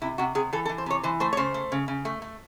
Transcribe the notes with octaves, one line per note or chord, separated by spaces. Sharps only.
C3 E4
C3 F#4
C3 G#4
E3 A4
A4
E3
C5
C3 C#5
E3 C5
A3 C5
C#5
C#3 C5
A3
C#3
C#3
A3
A3